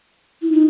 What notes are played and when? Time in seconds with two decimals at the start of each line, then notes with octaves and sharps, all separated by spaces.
0.42 E4
0.52 D#4